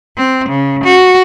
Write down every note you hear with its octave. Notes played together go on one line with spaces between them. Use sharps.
C4
C#3
F#4